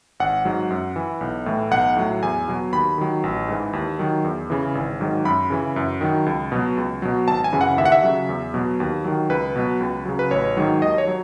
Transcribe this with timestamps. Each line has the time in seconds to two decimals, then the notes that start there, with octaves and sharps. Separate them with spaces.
0.20 G#1 F#5
0.45 G#2 F#3
0.70 F#2
0.96 E3
1.21 B1
1.46 A2 E3
1.71 B1 F#5
1.96 A2 F#3
2.22 E2 G#5
2.48 B2 F#3
2.72 D#2 B5
2.98 D#3 F#3
3.24 A1
3.48 G#2 E3
3.73 D#2
3.99 D#3 F#3
4.24 E2
4.50 C#3 E3
4.75 G#1
5.00 G#2 D#3 F#3
5.25 F#2 B5
5.50 C#3 E3
5.76 F#2
6.01 D#3 F#3
6.26 C#2
6.52 B2 F#3
6.77 C#2
7.02 B2 F#3
7.28 G#1 A5
7.44 G#5
7.52 F#2 C#3 E3
7.61 F#5
7.78 D#2 E5
7.85 F#5
7.92 E5
8.04 C#3 F#3
8.29 E2
8.54 B2 F#3
8.80 D#2
9.04 D#3 F#3
9.30 C#2 B4
9.55 B2 F#3
9.81 C#2
10.05 C#3 F#3
10.19 B4
10.31 A1 C#5
10.57 G#2 D#3 F#3
10.82 D#2 D#5
10.98 C#5
11.07 F#3